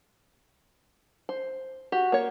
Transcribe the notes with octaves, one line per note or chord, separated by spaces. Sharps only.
C5
F#4 G4
A#3 C#5